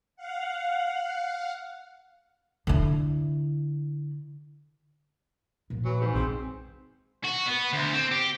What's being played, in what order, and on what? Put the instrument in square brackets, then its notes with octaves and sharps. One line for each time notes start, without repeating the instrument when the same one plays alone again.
[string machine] F5 F#5
[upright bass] D3 E4
A#2 F3
[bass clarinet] E3 [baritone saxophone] F#3
[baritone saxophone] G#2
[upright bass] A#1 [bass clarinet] C4
[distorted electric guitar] F#4
B3
D2
C4
G4